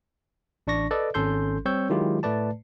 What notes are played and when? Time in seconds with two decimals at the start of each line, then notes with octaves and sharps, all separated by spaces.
0.67 A1 D4 D5 C#6 A#6
0.91 A4 B4 D5 D#5
1.14 G#1 C#4 A4 C6 G6
1.65 G3 C4 C#5 C#6 E6 G6
1.89 D#3 F#3 G#3 E4 F4 G4
2.23 A2 A3 B4 D5 A5